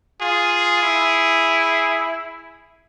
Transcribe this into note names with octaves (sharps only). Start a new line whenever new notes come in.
F4 G#4
E4